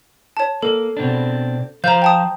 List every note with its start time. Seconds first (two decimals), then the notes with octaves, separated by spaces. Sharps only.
0.37 C#5 A5
0.63 A#3 A4
0.97 B2 C4 D4
1.84 F3 C5 F5 A#5 G6
2.02 G5 A5 D#6